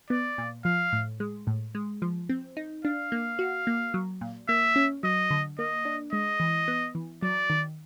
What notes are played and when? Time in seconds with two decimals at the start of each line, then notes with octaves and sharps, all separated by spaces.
0.10 B3 D5
0.38 A#2
0.65 F3 F5
0.93 A2
1.20 G#3
1.47 A2
1.75 G#3
2.02 F3
2.29 C4
2.57 D#4
2.85 D4 F5
3.12 A#3
3.39 F#4
3.67 A#3
3.94 F#3
4.21 A#2
4.48 A#3 E5
4.76 C#4
5.03 F#3 D#5
5.31 D3
5.59 A#3 D#5
5.85 D4
6.12 G#3 D#5
6.40 E3
6.68 B3
6.95 E3
7.22 F#3 D5
7.50 D#3